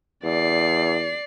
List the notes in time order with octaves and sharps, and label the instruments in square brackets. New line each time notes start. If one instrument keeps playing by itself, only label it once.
[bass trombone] E2 [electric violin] D5 C7